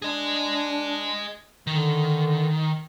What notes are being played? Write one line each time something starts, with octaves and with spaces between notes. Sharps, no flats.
D4 G#4 D#5
D3 D#3